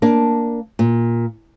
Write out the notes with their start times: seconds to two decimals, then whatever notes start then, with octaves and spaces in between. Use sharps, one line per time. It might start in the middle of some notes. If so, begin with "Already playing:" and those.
0.02 A#3 D4
0.79 A#2